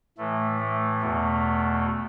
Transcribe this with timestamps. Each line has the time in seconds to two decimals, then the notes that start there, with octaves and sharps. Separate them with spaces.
0.18 A2 E3 A3
0.59 A3
1.01 E2 B2 A3